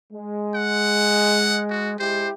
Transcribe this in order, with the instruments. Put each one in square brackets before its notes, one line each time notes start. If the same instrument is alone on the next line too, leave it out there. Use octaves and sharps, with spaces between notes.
[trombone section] G#3
[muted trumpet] F#5
F#4
[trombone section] G#3 E4 G4 [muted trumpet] C5